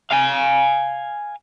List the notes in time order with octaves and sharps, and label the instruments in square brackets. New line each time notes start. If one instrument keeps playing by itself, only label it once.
[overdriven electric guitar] F5 G#5